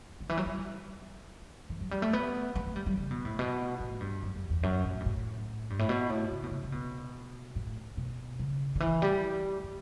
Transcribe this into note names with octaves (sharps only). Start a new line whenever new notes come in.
D3
E3
F#3
G3
E3
F#3
G3
A3
B3
B3
A3
G3
G3
C#3
B2
A2
B2
A2
G2
F#2
F#2
E2
F#2
A2
G2
A2
G2
A2
B2
A2
C#3
B2
C#3
C#3
B2
A2
B2
C#3
D3
E3
G3
A3